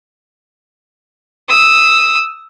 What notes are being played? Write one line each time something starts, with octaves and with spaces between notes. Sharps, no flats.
D#6 E6